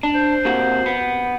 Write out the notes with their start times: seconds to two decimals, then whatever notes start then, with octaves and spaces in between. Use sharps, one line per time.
0.03 D4
0.15 C5
0.45 C3 A#3 F#4
0.86 B3